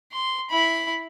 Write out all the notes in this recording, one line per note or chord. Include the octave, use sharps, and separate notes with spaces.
C6
E4 B5